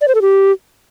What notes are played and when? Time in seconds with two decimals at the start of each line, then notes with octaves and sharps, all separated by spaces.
0.01 D5
0.08 C5
0.15 A4
0.22 G4